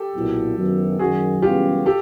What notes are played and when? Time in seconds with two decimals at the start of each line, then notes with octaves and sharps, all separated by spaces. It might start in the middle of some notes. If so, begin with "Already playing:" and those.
Already playing: G4 A4
0.14 B1 A#2 F#3 B3 E4
0.56 F#1 F#2 D#3 F#3 B3
0.99 F#2 D#3 F#3 F#4 G#4
1.42 F#2 C#3 E3 G3 B3 F4 G4
1.86 G4 A4